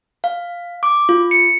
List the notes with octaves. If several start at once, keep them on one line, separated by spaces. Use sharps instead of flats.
F5
D6
F4
C#7